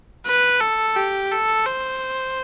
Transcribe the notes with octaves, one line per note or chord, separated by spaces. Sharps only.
B4
A4
G4
A4
C5